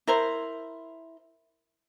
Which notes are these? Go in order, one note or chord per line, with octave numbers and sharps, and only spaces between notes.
E4 A#4 C5